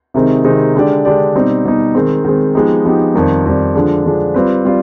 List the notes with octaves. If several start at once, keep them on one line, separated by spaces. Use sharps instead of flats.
C3 D#3 G#3 C4 D#4
C3 D#3 G#3 C4 D#4
D3 G#3 D4 G4 D5
D3 G#3 D4 G4 D5
B2 G3 C4 D#4
B2 G3 C4 D#4
D#3 G#3 C4
D#3 G#3 C4
F3 G#3 B3 D#4 G4
F3 G#3 B3 D#4 G4
F2 D#3 G3
F2 D#3 G3
D3 F3 G#3 D4
D3 F3 G#3 D4
G3 C4 F4 B4
G3 C4 F4